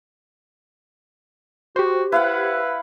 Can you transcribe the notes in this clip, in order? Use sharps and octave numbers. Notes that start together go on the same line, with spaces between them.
F#4 G4 C5
E4 B4 F5 F#5